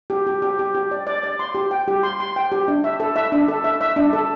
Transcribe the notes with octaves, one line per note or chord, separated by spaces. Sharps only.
G4
G4
G4
G4
G4
D5
D5
D5
C6
G4
G5
G4
C6
C6
G5
G4
D4
E5
A4
E5
D4
A4
E5
E5
D4
A4